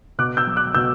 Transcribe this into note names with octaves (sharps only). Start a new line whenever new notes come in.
B2 D6 F#6
E6 G6
F#3
D6 F#6
B2 E6 G6